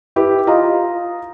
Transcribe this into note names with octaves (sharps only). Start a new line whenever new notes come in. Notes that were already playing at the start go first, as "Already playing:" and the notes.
E4 G4 B4
F4 D#5 F5 A#5